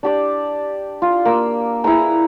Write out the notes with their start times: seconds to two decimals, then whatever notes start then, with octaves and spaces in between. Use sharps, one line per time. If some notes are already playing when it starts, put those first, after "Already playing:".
0.03 D4 G4 D5
1.02 F4
1.25 A#3 E6
1.84 E4 G#4 B4 A#5